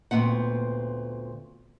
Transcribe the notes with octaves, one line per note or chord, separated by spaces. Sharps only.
D2 A#2 B3 C4 F#5